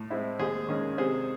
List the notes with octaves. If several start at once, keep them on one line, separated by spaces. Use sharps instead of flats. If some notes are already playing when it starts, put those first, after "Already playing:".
Already playing: A2
G#3 C4 E4
D#2 G#4 C5
D#3 G#3 C#4
C3 G#4 C5